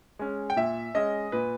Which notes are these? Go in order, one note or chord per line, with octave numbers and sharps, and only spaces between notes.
G#3 C#4
G5
A#2 E5
G#3 C#4 D#5
A#2 B4